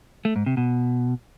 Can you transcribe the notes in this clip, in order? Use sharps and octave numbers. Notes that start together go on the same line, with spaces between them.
A3
G#2
C3
B2